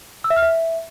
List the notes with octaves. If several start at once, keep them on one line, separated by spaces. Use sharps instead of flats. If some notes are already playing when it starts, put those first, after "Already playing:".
E6
E5
F6
E5